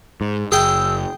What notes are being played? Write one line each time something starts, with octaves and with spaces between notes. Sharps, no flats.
G#2
F#1 G#4 G5 E6